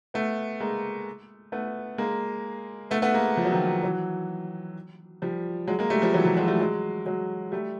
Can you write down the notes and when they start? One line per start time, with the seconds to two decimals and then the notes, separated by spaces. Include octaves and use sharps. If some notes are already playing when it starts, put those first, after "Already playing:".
0.14 A3 B3
0.60 G#3 A#3
1.52 A3 B3
1.98 G#3 A#3
2.91 A3 B3
3.02 A3 B3
3.14 G#3 A#3
3.37 F3
3.45 F#3
3.52 D#3 F3
3.83 E3 F#3
5.22 F3 G3
5.67 F#3 G#3
5.79 G#3 A#3
5.90 G3 A3
6.02 F3 G3
6.14 E3 F#3
6.25 F3 G3
6.37 F#3 G#3
6.48 G3 A3
6.60 F#3 G#3
7.06 F#3 G#3
7.52 G3 A3